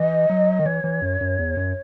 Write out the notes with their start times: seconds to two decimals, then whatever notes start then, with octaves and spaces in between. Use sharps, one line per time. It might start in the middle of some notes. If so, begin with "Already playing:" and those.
Already playing: E3 D#5
0.30 F#3
0.59 D#3
0.66 E3 C#5
0.84 E3
1.02 F#2
1.21 F#2
1.39 E2
1.57 F#2